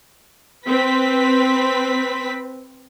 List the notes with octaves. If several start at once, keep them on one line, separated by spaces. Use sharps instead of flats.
C4 B4 B6